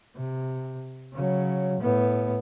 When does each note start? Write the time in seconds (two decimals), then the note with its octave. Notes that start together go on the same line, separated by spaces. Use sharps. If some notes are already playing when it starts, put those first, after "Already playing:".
0.16 C3
1.13 C#3 F#3
1.80 A2 B3